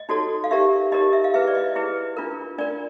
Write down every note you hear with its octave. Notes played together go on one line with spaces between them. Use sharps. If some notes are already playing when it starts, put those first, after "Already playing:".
Already playing: D#5
D#4 F#4 A4 C#5
F5
D#4 G4 A#4 C#5 E5
D#4 G4 A#4 C#5 D#5
E5
F5
E4 G#4 B4 E5
D5
D#5
E4 G#4 B4
D4 F4 A#4
D4 F4 A#4 D5